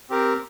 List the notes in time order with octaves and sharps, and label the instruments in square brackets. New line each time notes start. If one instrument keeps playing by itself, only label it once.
[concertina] C4 G4 A#4